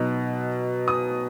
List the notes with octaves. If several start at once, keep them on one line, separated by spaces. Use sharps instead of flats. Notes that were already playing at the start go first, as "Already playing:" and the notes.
Already playing: B2 F#3 D#4
D#6